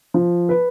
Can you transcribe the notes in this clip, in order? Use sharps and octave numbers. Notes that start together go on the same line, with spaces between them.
F3
B4